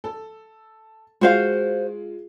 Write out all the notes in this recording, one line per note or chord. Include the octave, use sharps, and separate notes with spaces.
A4
G#3 F4 F#4 C5 F5